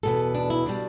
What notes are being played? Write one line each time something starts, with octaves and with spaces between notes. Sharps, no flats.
E2 B2 B3 A4
D4
E4
B2 G3 D4